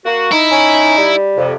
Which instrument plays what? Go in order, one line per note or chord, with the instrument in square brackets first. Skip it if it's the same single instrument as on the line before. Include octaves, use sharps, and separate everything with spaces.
[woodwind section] A#3 F#4
[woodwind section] D#4 [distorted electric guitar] E4
[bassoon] C#4
G3
[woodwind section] F2 C3